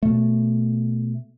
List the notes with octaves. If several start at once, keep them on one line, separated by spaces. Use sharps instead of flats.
B2 A3